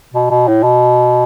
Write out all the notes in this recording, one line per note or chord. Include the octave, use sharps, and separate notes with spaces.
B2
B2
A2
B2